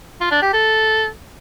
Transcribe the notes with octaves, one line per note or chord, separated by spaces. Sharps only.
F4
D4
G4
A4